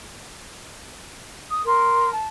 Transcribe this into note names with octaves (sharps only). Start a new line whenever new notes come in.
D#6
A#4 C6
A5